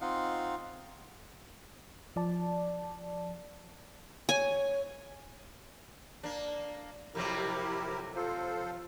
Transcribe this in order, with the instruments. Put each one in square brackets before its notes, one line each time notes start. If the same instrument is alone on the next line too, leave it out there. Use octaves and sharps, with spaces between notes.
[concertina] C4 D#4 F4 D#5 F5 F#5
[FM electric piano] F3 D5 A5
[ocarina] C#5 [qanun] G#5
[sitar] A#3 D4
[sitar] F2 C3 F#3 [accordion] E4 G4 A#4
[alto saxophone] F4 [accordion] A4 C5